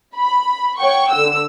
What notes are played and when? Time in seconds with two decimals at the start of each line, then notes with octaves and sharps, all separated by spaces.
0.15 B5
0.79 C#5 F#5 G5 C#6
1.11 D3 E6